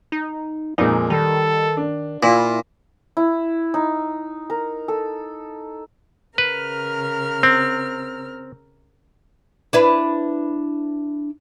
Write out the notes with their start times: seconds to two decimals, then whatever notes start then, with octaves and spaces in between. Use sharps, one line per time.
0.12 D#4
0.78 F2 A#2 G#3 D#4
1.10 D#3 G3 A4
1.77 D4
2.23 A#2 E4 F4
3.17 E4
3.74 D#4
4.50 A#4
4.88 A4
6.38 C#3 A#4 B4 F6
7.43 C4
9.73 D4 E4 B4